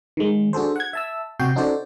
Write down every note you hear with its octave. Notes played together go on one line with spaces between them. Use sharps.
D#3 G#3
D4 F#4 G#4 A4 C5
F#5 G#6
E5 A5 E6
C3 F#4 G5 G6 C7
C#4 D#4 F#4 A4 C5 D5